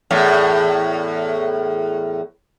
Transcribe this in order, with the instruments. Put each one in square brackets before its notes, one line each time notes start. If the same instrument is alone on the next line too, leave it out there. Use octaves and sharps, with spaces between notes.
[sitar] E2 A2